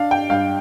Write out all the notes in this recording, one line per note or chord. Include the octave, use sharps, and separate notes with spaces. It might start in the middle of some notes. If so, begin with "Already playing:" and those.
Already playing: D4 F5
G5
G2 F5